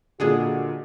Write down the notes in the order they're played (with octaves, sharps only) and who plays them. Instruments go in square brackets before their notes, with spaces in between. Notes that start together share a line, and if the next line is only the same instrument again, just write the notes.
[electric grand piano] A#2 D3 [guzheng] G#3 D4 G#4 [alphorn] F#4